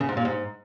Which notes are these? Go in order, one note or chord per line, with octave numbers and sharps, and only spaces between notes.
C#3
G#2
A#2
G#2